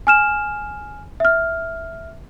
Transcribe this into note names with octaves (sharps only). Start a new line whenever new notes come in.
G#5 F6 E7
E5 F6